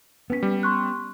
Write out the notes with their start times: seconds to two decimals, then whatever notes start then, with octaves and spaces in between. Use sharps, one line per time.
0.30 B3 C#4 B4 B6
0.43 G3
0.63 C6 C#6 F#6